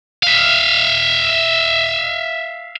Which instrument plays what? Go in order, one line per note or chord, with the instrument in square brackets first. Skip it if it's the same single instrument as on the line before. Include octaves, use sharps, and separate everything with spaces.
[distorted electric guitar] E5 F5